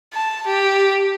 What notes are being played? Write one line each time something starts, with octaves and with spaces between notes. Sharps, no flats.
A5
G4